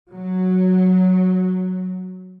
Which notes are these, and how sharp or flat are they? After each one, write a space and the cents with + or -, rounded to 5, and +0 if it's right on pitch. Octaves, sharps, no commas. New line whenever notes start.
F#3 -5